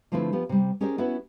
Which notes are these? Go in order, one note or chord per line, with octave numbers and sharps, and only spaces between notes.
D3 F3 A3 C4 E4 B4
F3 B3 G4
C3 G3
C#4 G4 G#4 A#4 C5 D5
B3 C#4 E4 F#4 B4